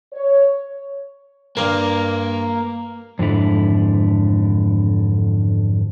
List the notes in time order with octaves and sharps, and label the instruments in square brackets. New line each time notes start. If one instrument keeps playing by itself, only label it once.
[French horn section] C#5
[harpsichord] G2 [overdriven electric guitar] A#3
[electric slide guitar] F2 G#2 D3 E4